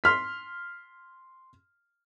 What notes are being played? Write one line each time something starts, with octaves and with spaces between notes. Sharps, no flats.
C6 F6 B6